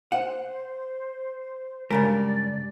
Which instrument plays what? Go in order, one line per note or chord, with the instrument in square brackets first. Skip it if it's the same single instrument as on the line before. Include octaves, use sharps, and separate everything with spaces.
[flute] C5 [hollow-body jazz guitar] F#5
[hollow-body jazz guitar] G2 C#3 A#4 [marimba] G#3 [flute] D5